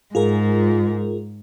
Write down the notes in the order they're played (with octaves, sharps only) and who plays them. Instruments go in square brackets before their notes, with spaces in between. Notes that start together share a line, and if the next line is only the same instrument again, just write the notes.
[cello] G#2 [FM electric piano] F4 G#4 A#4